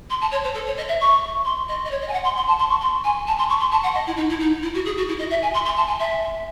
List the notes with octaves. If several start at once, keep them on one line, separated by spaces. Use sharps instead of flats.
C6
A5
C#5
C5
A4
C#5
D#5
E5
C#6
C6
D#5
D#5
C#5
D#5
G#5
F#5
C6
C6
A5
C6
C#6
C6
G#5
A5
C6
C#6
C6
A5
F#5
D#5
E4
D#4
E4
D#4
E4
F#4
G#4
F#4
E4
D#5
E5
G#5
C6
C6
A5
G#5
E5